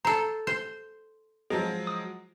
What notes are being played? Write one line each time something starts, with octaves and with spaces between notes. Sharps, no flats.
A4 C5 A#5
C5
F3 F#3 G#3 G#4
D#6